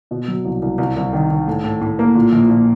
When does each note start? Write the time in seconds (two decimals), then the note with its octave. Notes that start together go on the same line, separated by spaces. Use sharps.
0.11 B2
0.28 F#3
0.45 C2
0.62 C2
0.78 C2
0.96 C2
1.13 D#3
1.30 D#3
1.48 A2
1.64 A2
1.81 A2
1.99 A#3
2.15 A#2
2.32 A#1
2.50 A#2